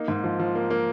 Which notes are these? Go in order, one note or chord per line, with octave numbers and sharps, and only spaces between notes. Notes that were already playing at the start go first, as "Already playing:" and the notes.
Already playing: A#3 D#4
G#2
F3
F3
A#3
A#3